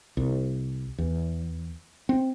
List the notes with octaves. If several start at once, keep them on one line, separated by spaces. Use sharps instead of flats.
C2
E2
C4